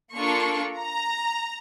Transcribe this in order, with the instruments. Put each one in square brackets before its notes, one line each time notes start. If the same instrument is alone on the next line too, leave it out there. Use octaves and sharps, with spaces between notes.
[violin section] A#3 D4 F4 A4 C#6
A#5